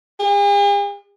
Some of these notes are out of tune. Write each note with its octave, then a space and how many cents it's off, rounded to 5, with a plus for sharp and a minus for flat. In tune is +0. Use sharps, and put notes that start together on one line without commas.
G#4 -45